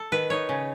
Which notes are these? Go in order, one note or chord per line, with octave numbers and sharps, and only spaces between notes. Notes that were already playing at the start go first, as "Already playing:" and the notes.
Already playing: A4
D#3 B4
D#4 C#5
C#3